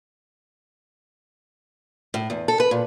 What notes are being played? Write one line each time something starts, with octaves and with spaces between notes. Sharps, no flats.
A2
E2
A4
B4
A#2